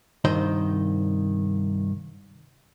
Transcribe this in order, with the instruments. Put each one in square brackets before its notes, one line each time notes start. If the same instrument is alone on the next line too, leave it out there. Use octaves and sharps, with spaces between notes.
[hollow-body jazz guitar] C2 G2 D#3 C5 D#5